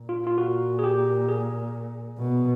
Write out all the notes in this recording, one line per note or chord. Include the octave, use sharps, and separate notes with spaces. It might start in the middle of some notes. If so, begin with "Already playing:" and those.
Already playing: A#2
F4
F4
F#4
G#4
G4
G#4
B2